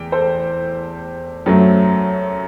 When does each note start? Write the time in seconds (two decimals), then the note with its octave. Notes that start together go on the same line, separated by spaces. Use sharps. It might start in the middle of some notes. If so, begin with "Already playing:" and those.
Already playing: E2 G5
0.12 A4 C5
1.46 F#2 F#3 A3